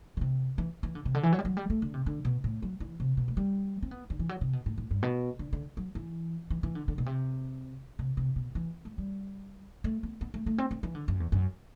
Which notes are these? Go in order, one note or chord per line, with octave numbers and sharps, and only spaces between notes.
D3
C3
E3
E3
D3
C3
D3
E3
F#3
G3
F#3
G3
A3
D3
C3
D3
B2
A2
F#3
E3
C3
B2
A3
G3
C4
B3
D3
E3
F#3
C3
B2
A2
A2
G2
B2
D3
D3
F#3
E3
E3
E3
D3
D3
B2
C3
C3
C3
B2
E3
A3
G3
A3
B3
B3
A3
A3
C4
C4
E3
D3
F#2
E2
F#2